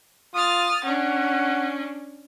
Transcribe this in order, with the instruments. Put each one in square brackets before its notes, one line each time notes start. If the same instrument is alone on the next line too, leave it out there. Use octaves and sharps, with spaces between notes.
[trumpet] F4 [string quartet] D#6 F6 A6
[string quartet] C#4 D4 [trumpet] F#5